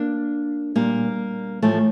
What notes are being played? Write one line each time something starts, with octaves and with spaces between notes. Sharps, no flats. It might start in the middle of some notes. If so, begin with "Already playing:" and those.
Already playing: A#3 D4
A#2 G3 A#3
A2 E3 F3 A3